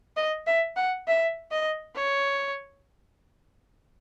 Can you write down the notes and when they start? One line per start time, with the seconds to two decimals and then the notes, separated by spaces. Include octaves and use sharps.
0.17 D#5
0.47 E5
0.76 F#5
1.08 E5
1.51 D#5
1.96 C#5